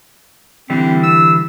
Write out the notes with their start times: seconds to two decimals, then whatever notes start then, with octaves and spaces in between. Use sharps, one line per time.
0.70 D3 E3 G3 C4
1.03 E6